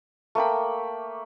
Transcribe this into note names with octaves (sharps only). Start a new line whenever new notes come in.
A3 A#3 G5 B5